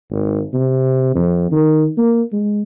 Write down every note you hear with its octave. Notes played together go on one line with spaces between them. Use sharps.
G#1
C3
F2
D#3
A#3
G#3